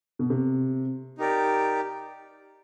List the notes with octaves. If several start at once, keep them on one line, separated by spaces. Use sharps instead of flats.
B2
C3
D#4 G4 A#4 D5